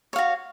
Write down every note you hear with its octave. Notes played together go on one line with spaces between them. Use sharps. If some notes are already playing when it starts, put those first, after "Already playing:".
F#4 C#5 F5